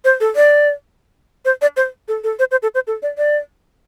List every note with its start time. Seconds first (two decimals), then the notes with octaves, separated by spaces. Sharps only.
0.05 C5
0.20 A4
0.36 D5
1.45 C5
1.62 D5
1.77 C5
2.08 A4
2.24 A4
2.39 C5
2.51 C5
2.63 A4
2.75 C5
2.87 A4
3.02 D5
3.18 D5